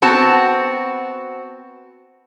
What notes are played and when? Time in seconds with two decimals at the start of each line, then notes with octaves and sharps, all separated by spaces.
0.02 B3 C4 F#4 A5